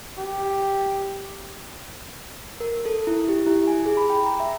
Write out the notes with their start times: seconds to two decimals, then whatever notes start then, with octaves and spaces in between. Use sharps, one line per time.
0.19 G4
2.60 A#4
2.85 A4
3.07 E4
3.29 G4
3.47 E4
3.67 G#5
3.86 G#4
3.97 B5
4.10 G5
4.26 A#5
4.40 E5